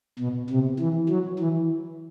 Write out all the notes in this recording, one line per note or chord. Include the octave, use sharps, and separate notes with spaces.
B2
C3
E3
F#3
E3